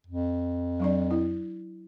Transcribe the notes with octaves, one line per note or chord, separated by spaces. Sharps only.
F2
F#3 D4 D5
E4